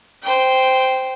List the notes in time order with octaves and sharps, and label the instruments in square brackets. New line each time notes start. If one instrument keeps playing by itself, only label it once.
[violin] C5 G5